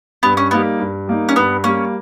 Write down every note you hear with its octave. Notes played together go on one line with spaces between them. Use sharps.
G2 B3
C#4
G3 A#3 B3 D#4
G2
G3 A#3 D#4
C#4
G2 B3
G3 A#3 C#4